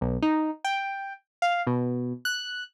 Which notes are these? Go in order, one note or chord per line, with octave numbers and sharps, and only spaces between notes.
B1
D#4
G5
F5
B2
F#6